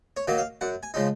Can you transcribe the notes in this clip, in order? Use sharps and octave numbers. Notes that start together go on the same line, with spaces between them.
C#5
D#3 F#3 A#3
F5
F#2 F#5
G#5
C#3 F3 G#3 D#4